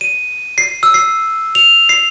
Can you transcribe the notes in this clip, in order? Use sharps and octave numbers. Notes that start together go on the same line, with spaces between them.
D#7
C7
E6
C7
F7
C7